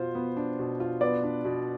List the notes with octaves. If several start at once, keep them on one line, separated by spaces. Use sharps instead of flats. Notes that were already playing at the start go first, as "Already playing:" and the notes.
Already playing: B2 F4 C5
B3
D4
B2
F4
B3 B4 D5
D4
B2